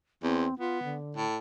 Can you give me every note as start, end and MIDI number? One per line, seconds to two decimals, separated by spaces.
0.23 0.46 40
0.23 0.54 60
0.59 0.97 59
0.59 0.82 65
0.84 1.24 50
1.17 1.39 45